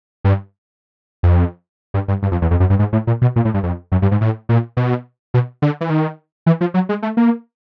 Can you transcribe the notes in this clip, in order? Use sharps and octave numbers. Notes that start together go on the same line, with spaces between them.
G2
F2
G2
G2
G2
F2
E2
F2
F#2
G2
G#2
A2
A#2
B2
A#2
A2
G2
F2
F#2
G2
G#2
A2
A#2
B2
B2
D3
E3
D#3
E3
F3
F#3
G#3
A3
A#3